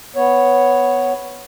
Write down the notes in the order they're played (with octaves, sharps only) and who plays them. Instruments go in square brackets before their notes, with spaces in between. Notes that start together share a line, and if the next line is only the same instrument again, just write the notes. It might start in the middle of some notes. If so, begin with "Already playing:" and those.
[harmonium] B3 C#5